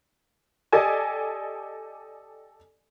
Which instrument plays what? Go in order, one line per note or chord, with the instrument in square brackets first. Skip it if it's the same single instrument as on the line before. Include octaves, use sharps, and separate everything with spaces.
[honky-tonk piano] G4 A4 D5 D#5 G#5